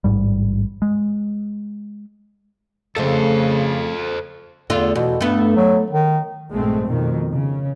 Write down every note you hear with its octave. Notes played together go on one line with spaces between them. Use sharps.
A1 G#2 G3
G#3
F2 C#3 A3 A4 C5
E2 D3 A3 F4
E2 B2
G2 A3 B3
F#3
D#3
A#1 G2 G#3 A3 C4
F2 B2 D#3
C#3